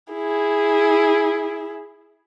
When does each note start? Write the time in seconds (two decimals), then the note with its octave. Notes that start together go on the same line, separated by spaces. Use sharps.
0.13 E4 G#4